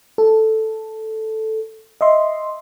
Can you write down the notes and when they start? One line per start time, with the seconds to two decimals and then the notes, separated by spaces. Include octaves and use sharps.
0.18 A4
2.01 D#5 E5 C6